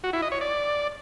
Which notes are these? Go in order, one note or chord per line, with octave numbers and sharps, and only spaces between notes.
F#4
E4
D#5
C#5
D5